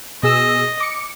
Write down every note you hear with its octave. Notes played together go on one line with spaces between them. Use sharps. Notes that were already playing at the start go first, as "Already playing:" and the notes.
B2 G#4 D#5 E6
D6 C#7